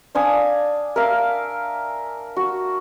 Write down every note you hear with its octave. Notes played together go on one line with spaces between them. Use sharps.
D4 F5 G#5 D#6
A#4 E5 F5
F#4